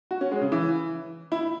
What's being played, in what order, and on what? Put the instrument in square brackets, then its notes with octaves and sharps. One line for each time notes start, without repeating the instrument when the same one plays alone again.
[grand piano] F#4
C#4
G#3
C#3
E3
E4